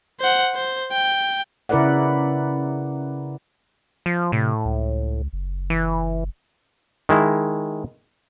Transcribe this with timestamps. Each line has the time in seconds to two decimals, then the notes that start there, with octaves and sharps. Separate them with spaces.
0.20 C5 F#5
0.55 C5
0.92 G5
1.69 C#3 E4 A#4 B4 D5 F#5
4.06 F3
4.32 A2 C3
4.65 C#2
5.33 F#1
5.70 E3
7.09 D#3 G#3 E4